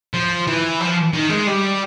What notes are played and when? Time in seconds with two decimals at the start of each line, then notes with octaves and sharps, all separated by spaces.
0.14 F3
0.47 E3
0.80 F3
1.13 D#3
1.29 G#3
1.47 G3